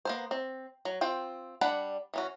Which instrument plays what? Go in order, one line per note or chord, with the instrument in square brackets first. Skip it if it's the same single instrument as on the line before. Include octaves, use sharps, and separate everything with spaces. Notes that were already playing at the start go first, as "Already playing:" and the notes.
[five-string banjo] A#3 B3 C5
C4
F#3
C4 F4 G5
G3 D4 D5 F#5 B5
E3 C#4 F#4